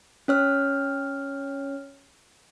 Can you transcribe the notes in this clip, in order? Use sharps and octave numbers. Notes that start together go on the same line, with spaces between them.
C#4 C#5 F6